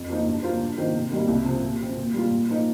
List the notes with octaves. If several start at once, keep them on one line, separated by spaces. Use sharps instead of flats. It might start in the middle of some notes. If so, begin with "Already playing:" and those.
Already playing: F2
F3 A#3 D#4
G2
F3 A#3 F4 C5
G2
D#3 A#3 F4 C5
C3
D#3 G3 A#3
C2
C3 F3
A#2
F3 C4
A#2
G3 A#3 F4
A#2
F3 A#3 D#4